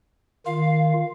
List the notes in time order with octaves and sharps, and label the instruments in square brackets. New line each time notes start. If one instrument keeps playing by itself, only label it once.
[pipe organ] D#3 F4 [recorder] F5